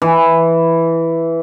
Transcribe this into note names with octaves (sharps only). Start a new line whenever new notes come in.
E3